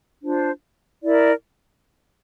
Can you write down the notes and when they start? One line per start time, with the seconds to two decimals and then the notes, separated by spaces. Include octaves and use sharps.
0.21 D4 F4 C5
1.03 E4 A#4 D5